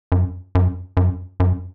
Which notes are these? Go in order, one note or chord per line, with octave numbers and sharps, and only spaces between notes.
F#2
F#2
F#2
F#2